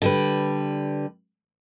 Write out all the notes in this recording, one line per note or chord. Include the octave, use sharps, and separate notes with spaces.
D3 G3 B4